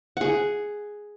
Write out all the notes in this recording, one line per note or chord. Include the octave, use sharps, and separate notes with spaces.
G#4 F#5